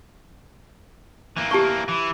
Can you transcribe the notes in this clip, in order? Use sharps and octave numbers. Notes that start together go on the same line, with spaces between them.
E3 A#3
G4 A5 C#6
E3